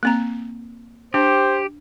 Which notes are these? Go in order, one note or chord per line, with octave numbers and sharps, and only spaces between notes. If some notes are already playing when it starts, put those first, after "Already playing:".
A#3 C4 A#5
D4 G4 C5